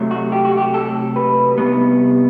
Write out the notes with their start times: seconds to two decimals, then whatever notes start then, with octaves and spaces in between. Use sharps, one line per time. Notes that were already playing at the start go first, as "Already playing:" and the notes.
Already playing: C3 F#3 A3
0.11 F#4
0.32 G4
0.45 F#4
0.57 G4
0.74 A4
1.16 B4
1.58 C3 G3 B3